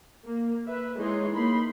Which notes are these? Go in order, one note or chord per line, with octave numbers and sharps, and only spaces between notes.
A#3
B4 E5
E3 G#3 D#4 G#4 C#5 C6
A#3 D#4 B5 C6